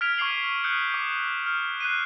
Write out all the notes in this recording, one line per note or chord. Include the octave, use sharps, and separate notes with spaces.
F6 G#6 B6 D7 F7
C#6 D6 G#6 C7 F#7
D#6 F#6 G6 C#7
D6
F6
F#6 C7 D#7